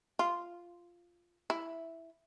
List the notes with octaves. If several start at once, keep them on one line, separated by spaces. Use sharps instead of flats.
F4
E4